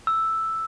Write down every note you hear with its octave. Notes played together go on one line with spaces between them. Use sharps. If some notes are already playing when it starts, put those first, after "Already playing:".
E6